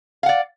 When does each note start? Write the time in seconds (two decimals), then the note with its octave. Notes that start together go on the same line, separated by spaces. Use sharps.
0.23 F5
0.26 F#5
0.29 D5